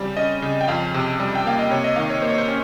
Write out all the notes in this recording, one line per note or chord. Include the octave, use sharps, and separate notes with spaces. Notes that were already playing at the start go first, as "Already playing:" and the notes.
Already playing: C#3 G3 C4 G4
C#4 D#5
C#3
G5
F2 F5
C3
G3
G5
A#3 F5
D#5
C3 C#5
D#5
D#3 F5
C#5
A#3 C5
C#5
C5
C#4